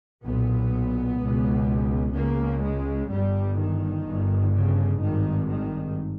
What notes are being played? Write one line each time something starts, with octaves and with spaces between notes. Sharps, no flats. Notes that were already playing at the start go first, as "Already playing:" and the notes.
B1 A#2 B3
C#2 B2
C#2 C#3 A#3
G#3
G1 G2 G3
D#3
G1 G2
C#3
G#1 G2 D#3
D#3